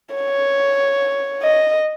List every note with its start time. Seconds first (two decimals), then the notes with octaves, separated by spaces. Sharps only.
0.15 C#5
1.42 D#5